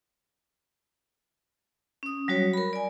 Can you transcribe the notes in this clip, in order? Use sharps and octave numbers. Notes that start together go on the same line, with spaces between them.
C#4 D#6
F#3 G3 F#4 C#5
A#4 B5
D5 G#5